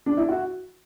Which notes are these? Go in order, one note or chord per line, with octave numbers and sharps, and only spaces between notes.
D4
E4
F#4